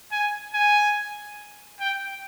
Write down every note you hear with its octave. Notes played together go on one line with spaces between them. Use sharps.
G#5
G#5
G5